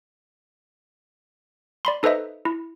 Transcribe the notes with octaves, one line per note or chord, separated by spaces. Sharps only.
D5 B5 C6
D#4 A4 B4 C5 D#5 E5
E4